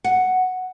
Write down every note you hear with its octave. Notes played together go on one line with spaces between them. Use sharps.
F#5